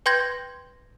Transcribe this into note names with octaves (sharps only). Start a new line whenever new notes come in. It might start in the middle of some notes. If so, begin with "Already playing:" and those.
B4 G5 C6 G6 G#6 A#6